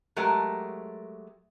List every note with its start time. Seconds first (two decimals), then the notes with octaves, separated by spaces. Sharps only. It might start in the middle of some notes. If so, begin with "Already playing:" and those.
0.16 F#3 G#3 A3 G4 A#4